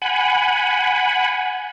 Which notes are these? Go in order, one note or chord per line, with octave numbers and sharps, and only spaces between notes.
F#5 G#5 B5